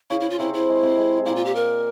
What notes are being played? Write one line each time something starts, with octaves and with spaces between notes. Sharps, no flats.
C#3 C#4 E4
E4
F4
C3 C4 E4
E4
G#3
C3 C4
G#3
G#3
A#2 A#3 E4
F4
G4
A#4